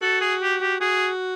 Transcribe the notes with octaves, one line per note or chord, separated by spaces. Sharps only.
F#4 A4
G#4
G4
G4
F#4 G#4